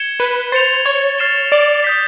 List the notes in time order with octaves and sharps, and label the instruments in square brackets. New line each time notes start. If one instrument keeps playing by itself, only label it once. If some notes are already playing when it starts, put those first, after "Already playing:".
Already playing: [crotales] G#6 C#7 E7 G7
[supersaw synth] B4
[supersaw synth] C5 [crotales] A6 C#7 F7
[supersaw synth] C#5
[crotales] F6 A6 C7 E7 G7
[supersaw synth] D5
[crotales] D#6 G6 B6